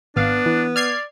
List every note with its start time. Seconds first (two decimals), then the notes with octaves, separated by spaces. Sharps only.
0.16 G#1 B3 D4 F5
0.46 E3
0.76 D5 F6 G#6 C7